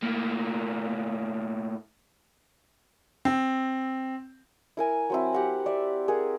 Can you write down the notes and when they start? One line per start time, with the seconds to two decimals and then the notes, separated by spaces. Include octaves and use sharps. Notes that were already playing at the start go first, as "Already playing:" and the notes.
0.02 A2 A#3
3.25 C4
4.77 E4 A#4 G#5
5.10 F#3 C4 E4
5.33 G4 F#5 A#5
5.66 D5 E5
6.08 G#4 A#4 F#5